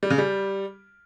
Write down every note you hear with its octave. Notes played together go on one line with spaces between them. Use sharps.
G3
C#3
G3